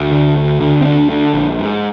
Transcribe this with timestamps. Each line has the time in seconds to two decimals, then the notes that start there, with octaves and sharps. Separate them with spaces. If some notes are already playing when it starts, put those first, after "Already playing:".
Already playing: D2
0.12 D3
0.36 D2
0.60 D3
0.81 C4
0.85 D2 D4
1.10 D3
1.34 A#1
1.59 G#2